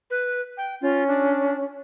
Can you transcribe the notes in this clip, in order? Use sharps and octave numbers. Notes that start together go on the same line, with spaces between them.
B4
G5
C#4 F4
D4